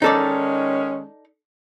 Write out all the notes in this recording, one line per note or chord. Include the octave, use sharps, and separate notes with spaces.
D#3 G#3 C#4 D#4 A4 D5